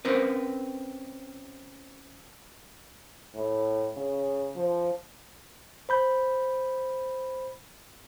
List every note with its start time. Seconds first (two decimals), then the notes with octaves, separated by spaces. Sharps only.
0.05 C4 C#4 A#4 B4
3.35 A2
3.97 C#3
4.56 F3
5.89 C5 B5 G6